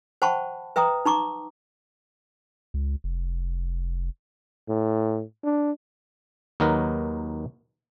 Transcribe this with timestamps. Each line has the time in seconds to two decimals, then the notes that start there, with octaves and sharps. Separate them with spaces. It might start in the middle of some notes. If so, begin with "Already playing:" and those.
0.22 C5 F#5 G5 A5 B5 C#6
0.76 B4 E5 G5 A#5 D#6
1.06 D#4 A#5 C#6 D6
2.74 C#2
3.04 F1
4.68 A2
5.44 D4
6.60 D#2 F#3 D#4 A#4 B4